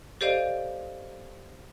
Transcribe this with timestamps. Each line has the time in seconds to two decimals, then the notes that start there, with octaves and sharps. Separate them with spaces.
0.21 G4 A4 C5 D5 D#5 F5